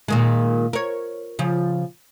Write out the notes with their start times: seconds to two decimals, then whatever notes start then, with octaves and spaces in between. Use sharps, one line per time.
0.08 A#2 D#3 G#3
0.73 A#4 C#5
1.39 C#3 F3